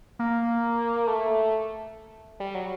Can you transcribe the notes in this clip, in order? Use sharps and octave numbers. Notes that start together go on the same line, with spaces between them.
A#3
A3
G3
F#3